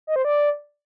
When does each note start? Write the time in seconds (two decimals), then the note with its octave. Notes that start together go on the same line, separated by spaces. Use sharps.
0.07 D#5
0.16 C5
0.25 D5